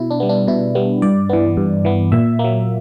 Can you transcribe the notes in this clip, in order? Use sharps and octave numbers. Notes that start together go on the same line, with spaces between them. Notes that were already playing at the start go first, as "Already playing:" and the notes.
Already playing: B2 E4
D4
G3 B3
D4
B2 E4
G3 B3
G2 D5
E3 B3
G2
E3 B3
A#2 E5
A#3
F#3